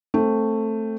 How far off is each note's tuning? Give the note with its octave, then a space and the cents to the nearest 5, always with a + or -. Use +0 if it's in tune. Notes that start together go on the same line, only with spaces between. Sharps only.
A3 +10 C4 +20